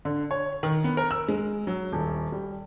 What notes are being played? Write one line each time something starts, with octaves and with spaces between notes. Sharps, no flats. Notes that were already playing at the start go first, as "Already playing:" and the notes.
D3
C#5
D#3
B3
A#4
E6
G#3
F#3
D#1
G3